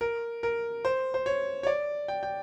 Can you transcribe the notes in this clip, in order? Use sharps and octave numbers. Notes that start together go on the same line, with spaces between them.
A#4
A#4
C5
C5
C#5
C#5
D5
G5
G5